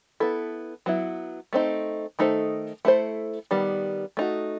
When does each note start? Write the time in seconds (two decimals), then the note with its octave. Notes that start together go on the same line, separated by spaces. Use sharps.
0.20 B3 E4 A4
0.86 F#3 B3 E4
1.53 A3 C4 D#4
2.19 D#3 A3 D#4 A4 C5
2.85 A3 E4 A4 C5
3.51 D#3 G3 B3
4.17 A3 D#4 F#4